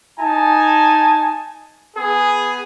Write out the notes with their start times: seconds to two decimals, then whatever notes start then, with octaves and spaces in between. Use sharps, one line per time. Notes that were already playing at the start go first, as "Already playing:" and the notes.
0.18 D#4 G#5 A5
1.96 B3 G#4